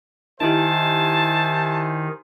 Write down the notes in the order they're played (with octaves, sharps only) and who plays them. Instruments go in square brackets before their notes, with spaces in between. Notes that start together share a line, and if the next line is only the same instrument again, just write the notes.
[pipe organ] D#3 [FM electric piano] D#4 E4 G4 [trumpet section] C5 E5 G#5 [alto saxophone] A5